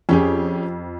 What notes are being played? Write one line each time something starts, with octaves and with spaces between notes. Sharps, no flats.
F2 C#4 G4 G#4